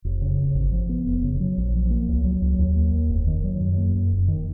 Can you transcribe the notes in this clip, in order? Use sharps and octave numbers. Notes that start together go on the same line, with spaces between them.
F1
C#3
F1
G#1
F3
B3
F1
C#3
F#3
A#1
F3
A#3
C#2
F#3
C#2
D#2
A#3
D#2
F1
D#3
F#3
F#2
A#3
F#2
F1
D#3